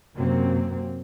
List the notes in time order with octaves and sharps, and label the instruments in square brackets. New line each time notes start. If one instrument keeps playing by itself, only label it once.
[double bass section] F#2 C3 F#3 A#3 C4